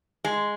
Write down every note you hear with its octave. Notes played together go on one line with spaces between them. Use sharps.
G#3